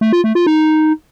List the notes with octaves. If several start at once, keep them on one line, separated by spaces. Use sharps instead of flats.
A3
F4
A3
F4
D#4